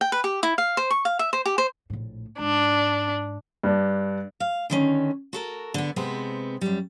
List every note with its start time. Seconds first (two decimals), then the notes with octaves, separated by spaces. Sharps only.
0.01 G5
0.12 B4
0.24 G4
0.43 E4
0.58 F5
0.77 C5
0.91 C#6
1.05 F5
1.19 E5
1.33 C5
1.46 G4
1.58 C5
1.90 A#1 A2
2.39 G#2 D4
3.63 G2 D4
4.40 F5
4.70 D3 D#3 C#4
5.33 F#4 A4 A#4
5.74 D3 B3
5.96 C3 G#3 B3 C4 B4
6.61 F#2 G3